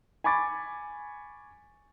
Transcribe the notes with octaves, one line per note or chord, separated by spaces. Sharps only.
G#5 B5 C#6 D6 A6